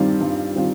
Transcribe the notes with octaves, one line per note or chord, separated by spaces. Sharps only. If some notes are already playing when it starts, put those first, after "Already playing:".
Already playing: G2 D#3 G3 C4 F4
G2
D#3 G3 C4 F4